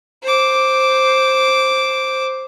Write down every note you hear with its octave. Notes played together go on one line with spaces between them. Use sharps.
C5 D6